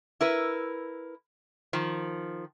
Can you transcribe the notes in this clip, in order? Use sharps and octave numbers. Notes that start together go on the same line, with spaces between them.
E4 A#4 B4
D#3 F3